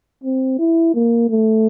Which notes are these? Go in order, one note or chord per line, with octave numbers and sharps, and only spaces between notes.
C4
E4
A#3
A3